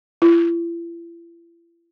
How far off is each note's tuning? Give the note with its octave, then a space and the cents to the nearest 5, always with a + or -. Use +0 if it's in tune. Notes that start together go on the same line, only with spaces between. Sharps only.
E4 +40